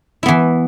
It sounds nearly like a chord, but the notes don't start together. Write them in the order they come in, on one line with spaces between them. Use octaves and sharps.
E4 B3 E3